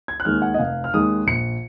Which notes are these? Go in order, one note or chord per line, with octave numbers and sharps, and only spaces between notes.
G#6
F#6
D#2 D#3 G#3 F6
F#5
D#5
F1 F5
F6
D#2 D#3 G#3 D#6
A#1 C#7